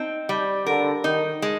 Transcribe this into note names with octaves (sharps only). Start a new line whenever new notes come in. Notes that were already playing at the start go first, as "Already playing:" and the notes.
Already playing: C4 D#4
G3
D3 A#4
D#3 D#4
G#3